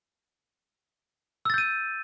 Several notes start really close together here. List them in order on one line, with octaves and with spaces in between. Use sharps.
E6 A6 G6 D#7